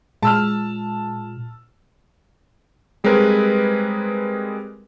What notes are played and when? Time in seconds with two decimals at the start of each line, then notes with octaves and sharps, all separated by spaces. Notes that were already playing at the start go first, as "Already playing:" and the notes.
0.23 A#2 G#3 A5 E6 F6
3.04 G3 G#3 C4 G#4 A#4 B4